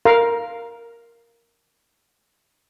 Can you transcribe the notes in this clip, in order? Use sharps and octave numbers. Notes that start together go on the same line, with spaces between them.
A#4 F5